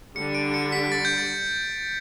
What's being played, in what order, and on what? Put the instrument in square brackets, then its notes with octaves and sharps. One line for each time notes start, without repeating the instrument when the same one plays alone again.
[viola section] D3 G3 D4 [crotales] C#7
[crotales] D7
C#7
B6
A6
G6
A6